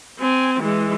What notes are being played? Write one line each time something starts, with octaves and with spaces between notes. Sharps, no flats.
C4 G#5
E3 G#3